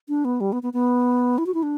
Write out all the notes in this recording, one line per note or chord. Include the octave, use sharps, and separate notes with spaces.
D4
B3
G3
B3
B3
B3
E4
F#4
E4
D4